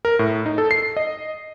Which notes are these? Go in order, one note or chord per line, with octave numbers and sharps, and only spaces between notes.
A#4
A2
D#4
A4
C7
D#5